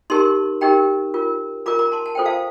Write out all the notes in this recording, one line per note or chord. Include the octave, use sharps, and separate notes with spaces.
D#4 G4 A#4 A5 C6
D#4 G4 A#4 G5 A#5
F4 A#4
F4 A#4 A#5 D6
A#5 D6
A5 C6
A5
F4 A4 C5 G5
F5 A5